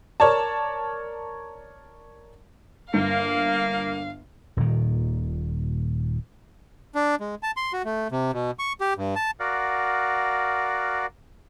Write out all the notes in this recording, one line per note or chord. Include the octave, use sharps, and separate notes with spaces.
A#4 C#5 D5 A5
G1 A#3 F5
D#1 A#2 D#3
D4
G#3
A5
C6
F#4
A3
C3
B2
C#6
G4
G2
A5
F#4 A#4 D5 F5 F#5